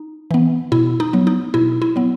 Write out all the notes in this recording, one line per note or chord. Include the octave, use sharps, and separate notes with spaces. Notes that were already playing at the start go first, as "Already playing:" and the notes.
Already playing: D#4
E3 B3
B2 E4
D#4
F#3 B3
D#4
B2 E4
E4
F#3 B3